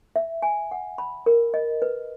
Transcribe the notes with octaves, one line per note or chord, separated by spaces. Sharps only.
E5
G#5
F#5
B5
A#4
D#5
B4